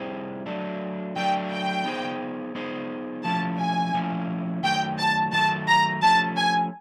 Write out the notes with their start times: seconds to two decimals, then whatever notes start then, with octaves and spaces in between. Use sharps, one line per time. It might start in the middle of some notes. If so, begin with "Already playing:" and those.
Already playing: G3 C4 E4 G#4 C5
0.46 F#3 A3 D4
1.16 F#3 A3 D4 G5
1.51 G5
1.85 B3 D#4 G#4 C5
2.55 B3 D#4 G#4 C5
3.24 F3 A3 C#4 E4 A5
3.59 G#5
3.94 F3 A3 C#4 E4
4.63 D#3 F#3 A3 G5
4.99 A5
5.33 D#3 F#3 A3 A5
5.68 A#5
6.02 F3 A3 C#4 A5
6.37 G#5